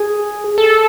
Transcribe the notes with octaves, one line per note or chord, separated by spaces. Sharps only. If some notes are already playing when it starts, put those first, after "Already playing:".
Already playing: G#4
A4